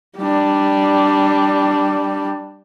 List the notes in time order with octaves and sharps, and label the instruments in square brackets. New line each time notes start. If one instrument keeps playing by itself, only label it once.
[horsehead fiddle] G3 D4